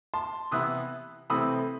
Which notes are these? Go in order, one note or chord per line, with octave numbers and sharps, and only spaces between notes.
A5 C6
C3 E3 B3 E4 D#6 F#6
C3 E3 A3 C4 B5 D#6